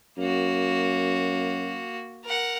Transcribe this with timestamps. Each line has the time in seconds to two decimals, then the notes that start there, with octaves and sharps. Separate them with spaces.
0.18 F#2 A#3 F#4
2.24 A#4 F#5